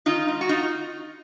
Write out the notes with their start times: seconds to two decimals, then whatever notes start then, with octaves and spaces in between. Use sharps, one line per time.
0.06 D#3 D#4 F4
0.28 G#2
0.41 F#4
0.49 D#4 F4